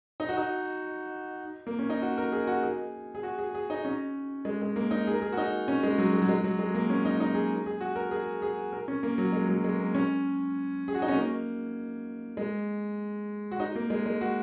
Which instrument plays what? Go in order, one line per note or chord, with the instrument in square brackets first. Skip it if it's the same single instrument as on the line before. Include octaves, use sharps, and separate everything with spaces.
[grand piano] D#4
F#4
D#4
A#3
C#4
D#4
F#4
A#4
G#4
F#4
G#4
G#4
F#4
G#4
G#4
D#4
C#4
G#3
G#3
A#3
D#4
G#4
A#4
G#4
F#4
D#4
C#4
G#3
F#3
G#3
F#3
G#3
F#3
G#3
A#3
C#4
D#4
D#4
G#4
G#4
F#4
A#4
G#4
G#4
A#4
C#4
A#3
F#3
G#3
F#3
G#3
A#3
C#4
G#4
F#4
D#4
C#4
A#3
G#3
F#4
D#4
A#3
G#3
G#3
F#4